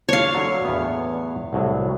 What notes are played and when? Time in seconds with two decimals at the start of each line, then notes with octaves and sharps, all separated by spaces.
0.09 D4 C#5 F5
0.34 D3 F#3
0.64 E2 A2 B3
1.53 C2 A2 F#3